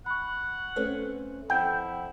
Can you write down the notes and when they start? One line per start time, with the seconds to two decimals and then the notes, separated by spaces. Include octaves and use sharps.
0.06 F#5 B5 C#6
0.76 A3 C4 C#4 B4
1.50 F2 E4 F#5 G5